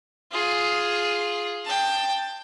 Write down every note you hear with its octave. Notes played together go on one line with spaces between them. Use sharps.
F4 G#4
G5 A5